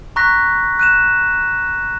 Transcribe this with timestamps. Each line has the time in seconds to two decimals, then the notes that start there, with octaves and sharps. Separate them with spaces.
0.16 A#5 C#6 F#6 A#6 B6
0.79 F#6 D#7 E7